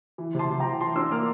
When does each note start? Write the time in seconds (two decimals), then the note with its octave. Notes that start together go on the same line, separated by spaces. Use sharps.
0.18 E3
0.35 C3 A5 C6
0.50 C3
0.60 G5 A#5
0.65 E3
0.81 E3 A5 C6
0.96 D4 C6 E6
1.11 A#3 D6 F6